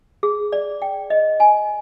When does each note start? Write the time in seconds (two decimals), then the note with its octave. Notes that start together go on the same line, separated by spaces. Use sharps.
0.23 G#4
0.52 D5
0.82 G5
1.10 D#5
1.40 G#5